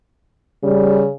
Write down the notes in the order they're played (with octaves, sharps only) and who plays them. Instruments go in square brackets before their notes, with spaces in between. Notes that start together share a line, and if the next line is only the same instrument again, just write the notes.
[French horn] C#3 [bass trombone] G3